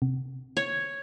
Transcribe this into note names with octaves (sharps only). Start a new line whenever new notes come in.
C3
C#5